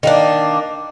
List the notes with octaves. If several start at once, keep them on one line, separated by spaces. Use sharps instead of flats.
D#3 A#3 D4